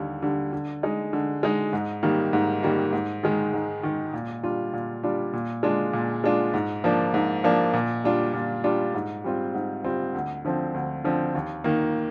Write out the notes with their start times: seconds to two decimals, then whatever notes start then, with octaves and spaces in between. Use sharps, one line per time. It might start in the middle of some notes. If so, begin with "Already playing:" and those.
Already playing: D#2 D3 G3
0.22 D3 G3
0.52 D3
0.83 G#3 D#4
1.13 D3
1.43 G#3 D#4
1.73 G#2
2.03 D#3 G3 A#3
2.33 G#2
2.63 D#3 G3 A#3
2.93 G#2
3.23 D#3 G#3
3.53 G#2
3.83 D#3 G#3
4.14 A#2
4.43 G3 D4 F4
4.73 A#2
5.03 G3 D4 F4
5.33 A#2
5.63 G#3 D4 F4
5.93 A#2
6.24 G#3 D4 F4
6.54 G#2
6.84 F3 A#3 D4
7.14 G#2
7.44 F3 A#3 D4
7.74 A#2
8.04 G3 D4 F4
8.33 A#2
8.64 G3 D4 F4
8.94 G#2
9.24 G3 C4 F4
9.54 G#2
9.84 G3 C4 F4
10.14 D2
10.45 D3 F3 C4
10.74 D2
11.04 D3 F3 C4
11.35 D#2
11.64 D#3 A#3